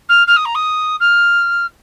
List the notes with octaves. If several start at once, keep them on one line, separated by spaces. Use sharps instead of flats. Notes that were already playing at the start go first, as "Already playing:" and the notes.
F6
F6
D#6
A#5
D#6
F6